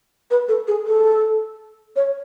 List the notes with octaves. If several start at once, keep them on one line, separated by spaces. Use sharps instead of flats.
B4
A4
G#4
A4
C#5